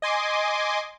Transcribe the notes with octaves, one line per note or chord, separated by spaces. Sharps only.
D#5 G#5 C6 D6